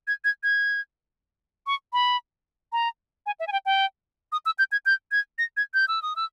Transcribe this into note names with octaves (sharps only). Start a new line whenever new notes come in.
G#6
G#6
G#6
C#6
B5
A#5
G#5
E5
G#5
G5
G5
D#6
E6
G6
G#6
G6
G#6
A#6
G#6
G6
E6
D#6
E6